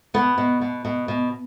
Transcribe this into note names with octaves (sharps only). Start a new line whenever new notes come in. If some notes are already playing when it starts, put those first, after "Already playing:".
B2 B3
B2
B2
B2
B2